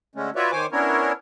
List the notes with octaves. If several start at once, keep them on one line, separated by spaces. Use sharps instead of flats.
D3 G#3 A3 C#4
F4 F#4 B4 C#5 D5 E5
D#3 C5 C#5 G#5 D6
B3 C#4 D4 E4 A#4 C#5